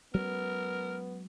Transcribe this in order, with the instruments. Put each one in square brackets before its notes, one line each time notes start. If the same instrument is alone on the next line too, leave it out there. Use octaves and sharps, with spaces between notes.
[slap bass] F#3 G#3 C#4 [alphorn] B3 [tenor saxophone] A#4